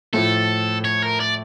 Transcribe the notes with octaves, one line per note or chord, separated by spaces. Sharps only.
A2 F3 A3 A4
C#5
A#4
D5